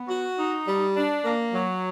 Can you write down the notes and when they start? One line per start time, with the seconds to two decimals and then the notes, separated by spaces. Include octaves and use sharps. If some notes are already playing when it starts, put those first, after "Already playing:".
Already playing: B3
0.08 F#4
0.37 D#4
0.66 G3
0.96 D4
1.24 A#3
1.53 F#3